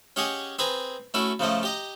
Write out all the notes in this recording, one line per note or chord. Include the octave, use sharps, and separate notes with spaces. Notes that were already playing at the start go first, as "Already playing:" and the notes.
C#4 G4 G#4 D#5 F#5 G#5
C4 G#4 B4 G#5 A#5
A3 C#4 E4 F#4
C#3 F3 A3 D#5
G4 D#5 A#5